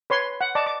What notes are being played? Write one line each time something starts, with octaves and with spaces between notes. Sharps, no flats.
B4 C#5 C6
F#5
D5 D#5 A5 D6
D6